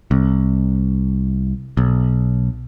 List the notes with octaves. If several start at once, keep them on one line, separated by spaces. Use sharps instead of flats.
C2
B1